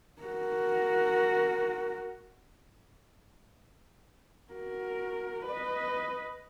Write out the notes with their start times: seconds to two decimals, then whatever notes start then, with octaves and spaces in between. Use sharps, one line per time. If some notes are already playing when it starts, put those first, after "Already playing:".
0.22 F#4 A#4
4.53 F#4 A#4
5.46 B4 D#5